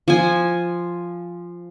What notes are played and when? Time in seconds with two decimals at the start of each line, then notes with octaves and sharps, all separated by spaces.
0.08 F3 G#5